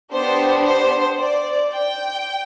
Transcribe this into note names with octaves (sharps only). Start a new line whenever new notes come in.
B3 D4 G4 C5
C5
D5
G5